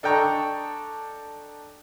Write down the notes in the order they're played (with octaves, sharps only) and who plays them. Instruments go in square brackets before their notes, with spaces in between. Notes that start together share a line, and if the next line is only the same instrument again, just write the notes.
[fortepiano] D4 A4 D#5 G5 A#5 C#6